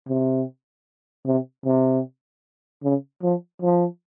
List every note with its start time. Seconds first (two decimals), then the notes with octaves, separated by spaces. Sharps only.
0.09 C3
1.26 C3
1.65 C3
2.83 C#3
3.23 F3
3.62 F3